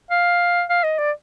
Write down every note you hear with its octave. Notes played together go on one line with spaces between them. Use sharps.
F5
F5
D#5
D5